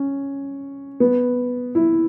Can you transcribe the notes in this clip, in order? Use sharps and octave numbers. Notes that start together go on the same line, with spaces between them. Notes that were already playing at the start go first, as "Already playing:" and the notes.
Already playing: C#4
B3
E4